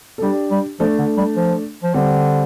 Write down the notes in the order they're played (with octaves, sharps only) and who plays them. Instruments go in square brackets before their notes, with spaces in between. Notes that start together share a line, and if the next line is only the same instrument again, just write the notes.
[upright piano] A4
[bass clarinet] G3 [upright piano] D4 G4
[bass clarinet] G3
[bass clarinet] F3 [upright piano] A3 D4
[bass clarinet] D3
G3
F3
F3
[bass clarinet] D3 [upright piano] G3 C4